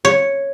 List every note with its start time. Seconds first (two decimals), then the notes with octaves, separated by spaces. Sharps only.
0.05 C#5